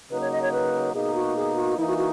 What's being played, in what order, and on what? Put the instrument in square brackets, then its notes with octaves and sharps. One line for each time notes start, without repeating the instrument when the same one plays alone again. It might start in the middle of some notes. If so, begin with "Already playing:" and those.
[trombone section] C#3 F#3 A#3 D#4 [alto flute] B4
[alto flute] C#5
D#5
C#5
B4
[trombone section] B2 A#3 D#4 [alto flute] G#4
[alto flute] F#4
G#4
F#4
[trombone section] E3 A#3 D#4 [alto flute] E4
[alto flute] F#4
F#4